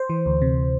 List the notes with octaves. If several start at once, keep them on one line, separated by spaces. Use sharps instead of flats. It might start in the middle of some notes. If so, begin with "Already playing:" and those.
Already playing: C5
E3
D2
C3